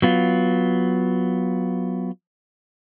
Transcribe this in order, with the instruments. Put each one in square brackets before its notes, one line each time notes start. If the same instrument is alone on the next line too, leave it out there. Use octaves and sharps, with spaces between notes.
[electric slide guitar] F#3 B3 F4